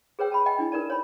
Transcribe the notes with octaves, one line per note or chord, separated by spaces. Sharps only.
G#4 B4 C#5 G5 E6
A5 B5
D#5 G5 G#5
D4 E4 G#5
D#4 A#4 B4 D5 A5
C#5 G#5 B5